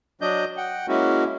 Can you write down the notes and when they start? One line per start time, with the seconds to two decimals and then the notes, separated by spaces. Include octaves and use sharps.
0.21 F#3 D4 D#5 G6
0.57 F#5 G5
0.88 G#3 A#3 C#4 E4 F#4